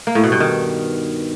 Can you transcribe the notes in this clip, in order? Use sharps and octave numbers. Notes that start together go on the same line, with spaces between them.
A#3
A2
B2
G2
D#3